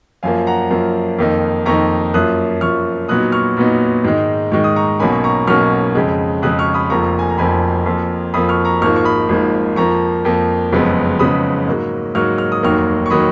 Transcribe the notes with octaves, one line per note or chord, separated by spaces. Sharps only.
F#2 F3 A#3 F5 G#5
F#5 A#5
F#2 F3 A#3
F2 D#3 A#3 D#4
F2 D#3 A#3 D#4 A#5 C#6
F#2 F3 A#3 D#6 F#6
F#2 F3 A#3 C#6 F6
A#2 F#3 B3 D#4 D#6 F#6
C#6 F6
A#2 F#3 B3 D#4
G#2 D#3 G#3 D#4
G#2 D#3 G#3 D#4 C#6
D#6
A#5 C#6
B1 B2 A#3 C#4 G#5 B5
A#5 C#6
B1 B2 A#3 C#4 C#6 F6
F2 C#3 G#3
F2 C#3 G#3 D#6 F#6
C#6 F6
B5 D#6
F1 F2 F3 A#3 A#5 C#6
G#5
A#5
F1 F2 F3 A#3 G#5 B5
F2 F3 A#3
F2 F3 A#3 B5 D#6
C#6 F6
A#5 C#6
G#1 G#2 F3 A#3 C#6 F6
C#6
B5 D#6
G#1 G#2 F3 A#3
F2 F3 A#3 A#5 C#6
F2 F3 A#3
F#1 F2 C#3 G#3 B3
F#1 F2 C#3 G#3 B3 B5 D#6
G#2 F#3 A#3
G#2 F#3 A#3 C#6 F6
F6
D#6
F1 D#2 D#3 F#3 A#3 C#6 F6
C#6
D#3 F#3 A#3 B5 D#6